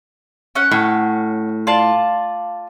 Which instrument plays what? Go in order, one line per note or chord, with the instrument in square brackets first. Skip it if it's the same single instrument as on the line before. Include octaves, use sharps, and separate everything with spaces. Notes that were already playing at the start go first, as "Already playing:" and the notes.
[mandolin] C#4 F#5
[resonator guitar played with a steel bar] A2
[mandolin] F4 D5 A5